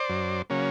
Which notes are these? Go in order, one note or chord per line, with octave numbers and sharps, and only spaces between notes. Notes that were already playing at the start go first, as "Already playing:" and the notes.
Already playing: C5 D5
F#2
C#3 F#3 A#3 C#4